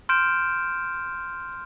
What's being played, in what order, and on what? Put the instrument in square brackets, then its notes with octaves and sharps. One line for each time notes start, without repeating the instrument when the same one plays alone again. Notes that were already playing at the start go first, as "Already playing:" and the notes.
[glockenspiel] C6 F6 G6 D7 E7